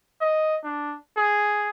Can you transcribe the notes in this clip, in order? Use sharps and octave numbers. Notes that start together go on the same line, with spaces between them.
D#5
D4
G#4